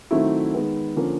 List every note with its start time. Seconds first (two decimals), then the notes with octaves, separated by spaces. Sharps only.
0.11 D#3 F#3 A3 C4 E4
0.54 D#3 G#3 B3
0.96 D3 F3 A#3 C#4